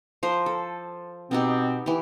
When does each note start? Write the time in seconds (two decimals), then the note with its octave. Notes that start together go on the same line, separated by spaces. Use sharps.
0.23 F3 A#4 C5
0.46 A4
1.31 B2 B3 C4 D#4 G4
1.86 E3 G4